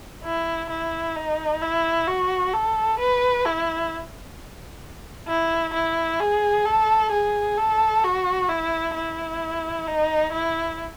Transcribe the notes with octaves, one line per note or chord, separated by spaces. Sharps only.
E4
E4
D#4
E4
F#4
A4
B4
E4
E4
E4
G#4
A4
G#4
A4
F#4
E4
E4
D#4
E4